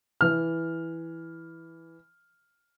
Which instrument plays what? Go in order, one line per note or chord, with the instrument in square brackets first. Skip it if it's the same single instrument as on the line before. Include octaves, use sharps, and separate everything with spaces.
[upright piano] E3 F6